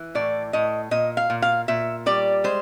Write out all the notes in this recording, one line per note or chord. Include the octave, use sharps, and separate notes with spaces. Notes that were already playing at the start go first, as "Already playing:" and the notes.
Already playing: E3
A2 D5
A2 D#5
A#2 D#5
F5
A#2
F5
A#2 E5
G3 D5
G#3 C5